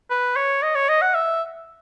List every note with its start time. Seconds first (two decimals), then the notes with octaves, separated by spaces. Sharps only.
0.10 B4
0.36 C#5
0.63 D#5
0.75 C#5
0.89 D#5
1.02 F#5
1.15 E5